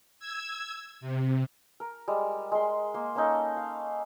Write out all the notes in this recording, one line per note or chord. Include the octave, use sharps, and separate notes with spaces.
E6 G#6
C3
A#4
G3 G#3
G#3 C6
A#3 C6
A#3 C#4 D#4 A4
F5